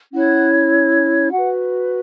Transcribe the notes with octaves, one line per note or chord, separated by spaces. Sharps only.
C#4 E4 C#5 F#5
F#4 B4 F#5